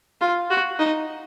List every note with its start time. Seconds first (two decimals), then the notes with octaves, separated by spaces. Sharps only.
0.21 F4
0.50 F#4
0.79 D#4